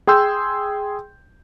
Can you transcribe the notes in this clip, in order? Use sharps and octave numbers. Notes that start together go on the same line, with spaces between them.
G#4 G5 C6 E6 G6